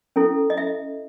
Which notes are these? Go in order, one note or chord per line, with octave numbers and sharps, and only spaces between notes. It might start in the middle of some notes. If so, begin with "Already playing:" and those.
C#4 E4 A4
D#5
E5